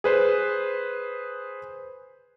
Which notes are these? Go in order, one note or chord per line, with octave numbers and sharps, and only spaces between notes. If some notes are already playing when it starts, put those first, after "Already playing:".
G#4 B4 C5